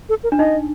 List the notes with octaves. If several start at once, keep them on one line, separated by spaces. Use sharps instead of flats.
A4
A#4
D4
D#4 D#5